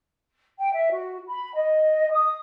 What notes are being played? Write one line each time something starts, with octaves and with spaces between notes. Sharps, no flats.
G5
E5
F#4
B5
D#5
D#6